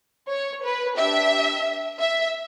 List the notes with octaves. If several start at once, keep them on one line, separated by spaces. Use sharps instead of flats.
C#5
B4
D4 G4 E5
E5